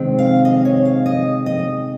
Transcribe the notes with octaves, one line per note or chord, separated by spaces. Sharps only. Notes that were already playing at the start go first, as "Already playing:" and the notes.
Already playing: C3 D#3 G#3 C4
F5
D#5
C#5
F5
D#5
D#5